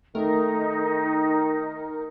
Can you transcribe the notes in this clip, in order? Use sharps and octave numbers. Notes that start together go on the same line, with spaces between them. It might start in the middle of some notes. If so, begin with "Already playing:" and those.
D#3 A3 D#4 A#4